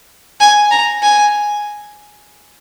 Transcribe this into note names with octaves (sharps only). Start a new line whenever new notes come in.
G#5
A#5
G#5